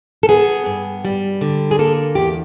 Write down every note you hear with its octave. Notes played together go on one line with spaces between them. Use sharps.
A4
B3 G#4
G2
G3
D3
G#4
A#3 A4
E2 G4